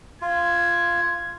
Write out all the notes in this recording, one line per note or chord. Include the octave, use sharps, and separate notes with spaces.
F4 G#6